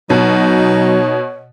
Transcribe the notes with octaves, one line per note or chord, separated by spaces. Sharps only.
B2 F#3 D#4 C#5